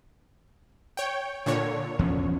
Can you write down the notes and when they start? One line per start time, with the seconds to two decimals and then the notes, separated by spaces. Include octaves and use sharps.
0.97 C#5 G5
1.46 A#2 D3 C#5
1.99 E2 F3 C#4